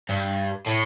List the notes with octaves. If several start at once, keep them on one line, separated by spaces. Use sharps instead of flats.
G2
A2